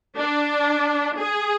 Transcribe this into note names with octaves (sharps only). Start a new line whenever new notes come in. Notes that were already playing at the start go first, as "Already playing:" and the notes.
D4
G#4